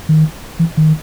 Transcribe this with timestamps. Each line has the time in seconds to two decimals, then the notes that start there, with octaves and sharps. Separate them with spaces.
0.09 D#3
0.59 E3
0.77 D#3